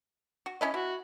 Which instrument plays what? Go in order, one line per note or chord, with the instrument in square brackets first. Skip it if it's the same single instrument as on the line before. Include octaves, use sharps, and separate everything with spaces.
[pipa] F#4
C#4 E4 D#5
[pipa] E4 [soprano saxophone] F#4